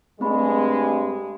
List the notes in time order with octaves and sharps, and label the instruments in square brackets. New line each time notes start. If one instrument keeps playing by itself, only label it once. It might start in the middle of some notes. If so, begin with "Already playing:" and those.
[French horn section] G2 G#3 [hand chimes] A3 C4 B5